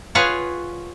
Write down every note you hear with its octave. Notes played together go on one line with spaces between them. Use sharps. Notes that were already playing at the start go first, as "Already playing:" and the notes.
F4 G#4 B4 C#5 F5 F#5